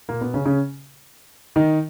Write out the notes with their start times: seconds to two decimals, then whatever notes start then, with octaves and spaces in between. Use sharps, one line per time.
0.09 A#2 A#3
0.21 B2 B3
0.34 C#3 C#4
0.46 C#3 C#4
1.56 D#3 D#4